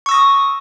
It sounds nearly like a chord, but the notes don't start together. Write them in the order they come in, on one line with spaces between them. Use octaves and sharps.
C#6 E6 A#6 D#6